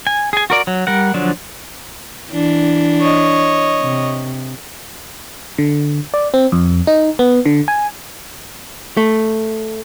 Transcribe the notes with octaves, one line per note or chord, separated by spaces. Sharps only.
G#5
G#4 G#5
F#4 A#4 D5
F#3
G3 A#4 F#5
D3 F3 F#3 D4
E3 D4
C#5 D#5
C3
D3
D5
C4
F2
D#4
B3
D3
G#5
A3